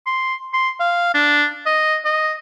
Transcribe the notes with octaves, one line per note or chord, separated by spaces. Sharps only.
C6
C6
F5
D4
D#5
D#5